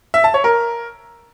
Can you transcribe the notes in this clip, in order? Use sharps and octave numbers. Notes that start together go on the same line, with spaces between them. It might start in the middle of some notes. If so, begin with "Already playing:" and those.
E5
A5
C#5
A#4